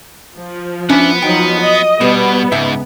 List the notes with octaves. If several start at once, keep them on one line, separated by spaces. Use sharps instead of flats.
F3
B3 C#4 D4 E4 F#5
F3 F#3 D#4 G5
D#5
B2 G3 B3
C#2 G#2 E5